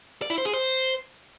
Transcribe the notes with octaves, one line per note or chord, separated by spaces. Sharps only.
D5
E4
C5
G#4
C5